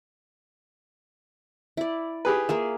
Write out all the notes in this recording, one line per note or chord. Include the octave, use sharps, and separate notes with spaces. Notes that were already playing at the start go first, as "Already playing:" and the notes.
E4 D5
G4 G#4 B4
A#3 F4 G#4 E5